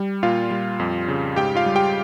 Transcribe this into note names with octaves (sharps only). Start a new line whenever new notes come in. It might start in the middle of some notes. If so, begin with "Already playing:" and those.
Already playing: G3
A#2 F4 F5
G3
F2
C#3
G#2 G4 G5
F4 F5
G3
G4 G5